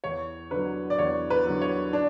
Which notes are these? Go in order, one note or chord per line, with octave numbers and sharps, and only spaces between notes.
E2 C#5
D3 F#3 B4
D5
E2 C#5
B4
D3 F#3
C#5
D4